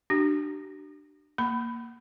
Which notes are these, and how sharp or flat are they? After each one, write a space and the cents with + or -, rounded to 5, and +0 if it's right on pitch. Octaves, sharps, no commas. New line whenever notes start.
D4 +25 G4 -45
A#3 +0 B5 +15